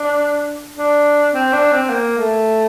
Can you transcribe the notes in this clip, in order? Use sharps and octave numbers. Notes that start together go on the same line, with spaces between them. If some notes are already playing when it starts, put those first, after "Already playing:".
Already playing: D4
D4
C4
D4
C4
A#3
A3